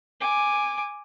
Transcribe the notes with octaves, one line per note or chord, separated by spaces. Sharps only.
G#5 D6